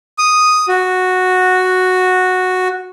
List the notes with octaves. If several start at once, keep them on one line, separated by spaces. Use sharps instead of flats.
D#6
F#4